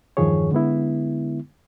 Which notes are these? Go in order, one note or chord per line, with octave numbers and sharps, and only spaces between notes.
E2 G2 D#3 F3 G#4 C#5
D3 G#3 B3 E4